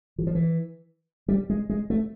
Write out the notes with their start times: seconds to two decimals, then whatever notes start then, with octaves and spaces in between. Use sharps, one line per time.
0.18 E3
0.27 F3
0.35 E3
1.28 G3
1.50 G#3
1.70 G#3
1.90 A3